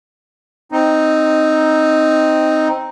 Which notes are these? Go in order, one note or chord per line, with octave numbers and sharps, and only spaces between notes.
C4 D#4